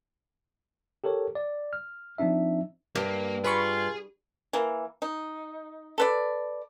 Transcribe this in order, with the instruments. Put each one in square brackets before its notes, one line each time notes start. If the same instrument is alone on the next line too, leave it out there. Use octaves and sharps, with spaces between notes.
[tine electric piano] G4 A4 A#4 C#5
D5
F6
F3 C4 D4 D#4 E5
[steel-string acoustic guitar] G2 [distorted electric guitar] A#3
[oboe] F4 [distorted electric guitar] G#4 [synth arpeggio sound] B4 B5 C#6
[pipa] E3 A#3
D#4
A4 B4 D5